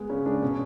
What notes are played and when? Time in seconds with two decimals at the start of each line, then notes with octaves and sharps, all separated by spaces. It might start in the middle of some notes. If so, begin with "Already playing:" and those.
Already playing: G#3 B3
0.09 C#3 C#4
0.26 G#3 D4
0.42 B2 C#4